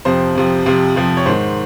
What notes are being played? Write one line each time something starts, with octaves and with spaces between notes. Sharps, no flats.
F2 C3 F3 C5
F2 C3 F3
F2 C3 F3
F2 C3 F3
C#5
G#2 D#3 C5